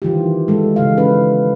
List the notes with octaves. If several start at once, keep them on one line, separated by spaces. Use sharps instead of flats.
D#3 E3 F4 G4
G#3 A4
C#3 E3 F5
C#4 B4